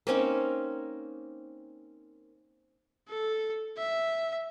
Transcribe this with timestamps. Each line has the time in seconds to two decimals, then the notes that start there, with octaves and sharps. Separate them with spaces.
0.07 A#3 C4 C#4 D#4
3.09 A4
3.77 E5